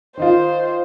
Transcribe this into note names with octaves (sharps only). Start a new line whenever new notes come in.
D#3 D#4 F4 C5